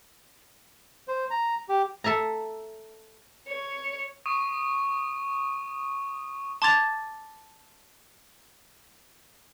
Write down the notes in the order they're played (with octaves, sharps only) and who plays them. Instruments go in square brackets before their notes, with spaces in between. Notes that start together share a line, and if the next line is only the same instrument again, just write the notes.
[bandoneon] C5
A#5
G4
[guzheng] A4 E5 A5 A#5
[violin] C#5
[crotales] C#6 D#6 D#7
[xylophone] A5 C6 D6 G#6 A6 F7